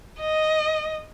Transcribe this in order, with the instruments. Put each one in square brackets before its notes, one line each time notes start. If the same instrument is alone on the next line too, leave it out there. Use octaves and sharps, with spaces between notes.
[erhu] D#5